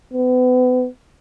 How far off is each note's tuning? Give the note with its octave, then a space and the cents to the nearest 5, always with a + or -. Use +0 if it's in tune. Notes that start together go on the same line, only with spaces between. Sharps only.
B3 +35